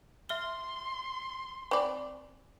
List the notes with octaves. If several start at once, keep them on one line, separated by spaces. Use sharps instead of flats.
E5 C6 F6 G7
C4 D5 G#5 B5 C#6